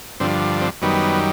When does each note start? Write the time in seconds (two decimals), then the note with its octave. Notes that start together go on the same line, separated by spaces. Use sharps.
0.20 G2 D3 F3 C4
0.61 C4
0.82 F#2 D#3 G3 B3